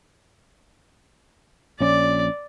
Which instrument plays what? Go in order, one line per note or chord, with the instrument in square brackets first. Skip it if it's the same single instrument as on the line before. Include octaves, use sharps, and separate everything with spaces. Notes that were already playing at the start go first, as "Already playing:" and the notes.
[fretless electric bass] A#1 C#4 [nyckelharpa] D5